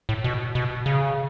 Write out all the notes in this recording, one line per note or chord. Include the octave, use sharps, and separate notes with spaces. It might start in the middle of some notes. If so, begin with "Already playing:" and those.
A2
B2
B2
C#3